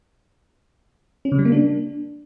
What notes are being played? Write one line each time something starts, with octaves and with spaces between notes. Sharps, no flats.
C#4
C#3
G3
A#3
D4